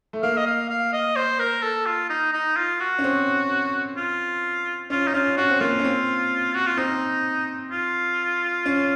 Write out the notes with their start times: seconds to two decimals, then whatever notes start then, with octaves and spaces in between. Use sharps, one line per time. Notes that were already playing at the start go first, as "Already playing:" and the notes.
0.13 A3
0.23 A#3 F5
0.37 D#5
0.46 F5
0.69 F5
0.93 D#5
1.16 C5
1.39 A#4
1.63 A4
1.86 F4
2.10 D#4
2.33 D#4
2.57 F4
2.80 F#4
2.99 C#4
3.04 C4
3.97 F4
4.90 C#4 F4
5.07 D#4
5.14 C#4 F4
5.37 C#4 F#4
5.50 C4
5.60 A#3 F4
5.79 C#4
5.84 C4
6.54 F#4
6.66 F4
6.77 C4 D#4
7.71 F4
8.66 C#4